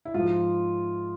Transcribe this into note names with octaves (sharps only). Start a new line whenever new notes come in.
E4
G#2 F3 F4